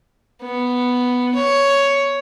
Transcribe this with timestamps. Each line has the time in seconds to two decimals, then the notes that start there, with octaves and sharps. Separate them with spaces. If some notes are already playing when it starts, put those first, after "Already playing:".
0.43 B3
1.36 C#5